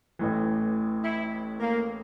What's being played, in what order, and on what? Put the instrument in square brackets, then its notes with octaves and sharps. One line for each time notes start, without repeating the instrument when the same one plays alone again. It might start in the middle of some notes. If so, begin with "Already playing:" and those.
[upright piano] A1 A2 E3
[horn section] E4
A#3